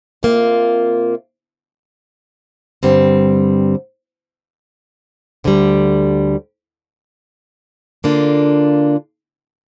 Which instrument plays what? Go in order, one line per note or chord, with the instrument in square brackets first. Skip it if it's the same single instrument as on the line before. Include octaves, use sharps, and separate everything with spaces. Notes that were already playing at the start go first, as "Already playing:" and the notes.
[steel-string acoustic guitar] C3 A#3 F4
G2 D3 G3 C4
D2 D3 G3
D3 A#3 D4 F4